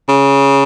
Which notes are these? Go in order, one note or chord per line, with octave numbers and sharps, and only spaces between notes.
C#3